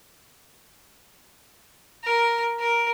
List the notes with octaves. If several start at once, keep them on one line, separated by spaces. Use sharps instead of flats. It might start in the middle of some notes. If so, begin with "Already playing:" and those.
A#4
A#4